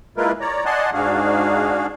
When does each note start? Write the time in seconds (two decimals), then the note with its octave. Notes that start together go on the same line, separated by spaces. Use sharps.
0.17 G#3 A#3 E4 F4 A#4 B4
0.41 C#5 D5 A#5
0.65 D5 D#5 F#5 G#5 A5 C6
0.94 G#2 D4 F#4 G#4 F5